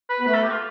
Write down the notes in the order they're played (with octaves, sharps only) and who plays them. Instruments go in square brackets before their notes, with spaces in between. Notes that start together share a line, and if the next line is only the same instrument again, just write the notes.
[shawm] B4
[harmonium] B3
[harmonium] A3 [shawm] B4
[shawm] A4
G4
F4